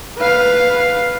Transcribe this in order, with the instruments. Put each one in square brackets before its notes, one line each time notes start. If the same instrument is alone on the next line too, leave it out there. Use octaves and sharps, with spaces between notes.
[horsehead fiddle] B4 F5